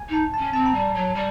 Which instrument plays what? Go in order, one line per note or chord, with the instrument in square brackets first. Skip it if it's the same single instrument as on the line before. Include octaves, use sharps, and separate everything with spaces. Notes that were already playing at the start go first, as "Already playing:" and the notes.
Already playing: [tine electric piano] G#5
[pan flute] D#4 [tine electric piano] A5
[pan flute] C#4 [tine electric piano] A5
[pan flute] C4 [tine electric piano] A5
[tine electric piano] A#5
[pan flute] G3 [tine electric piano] A5
[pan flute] F#3
G3